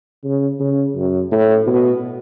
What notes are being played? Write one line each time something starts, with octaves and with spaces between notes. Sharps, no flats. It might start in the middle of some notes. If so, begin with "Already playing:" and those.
C#3
C#3
F#2
A2
B2